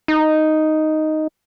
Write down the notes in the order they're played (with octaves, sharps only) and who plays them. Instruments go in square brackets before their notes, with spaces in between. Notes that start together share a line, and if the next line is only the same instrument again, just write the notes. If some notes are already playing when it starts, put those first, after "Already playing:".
[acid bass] D#4